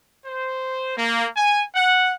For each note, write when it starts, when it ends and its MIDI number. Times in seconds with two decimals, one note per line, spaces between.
0.24 0.94 72
0.97 1.26 58
1.37 1.63 80
1.75 2.13 78